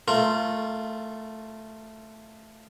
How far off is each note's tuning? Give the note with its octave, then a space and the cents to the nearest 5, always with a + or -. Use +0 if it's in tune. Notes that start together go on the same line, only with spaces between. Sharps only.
A3 +0 F4 +0 A#4 -30